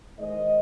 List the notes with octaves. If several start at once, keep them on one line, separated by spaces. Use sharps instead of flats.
G#2 D#3 G#3 D#5